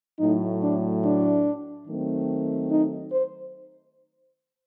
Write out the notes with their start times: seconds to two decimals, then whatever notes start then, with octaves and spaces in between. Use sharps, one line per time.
0.20 A2 F#3 A3 D#4
0.63 D4
1.04 D4
1.88 D#3 F#3 A3 C4
2.70 D#4
3.12 C5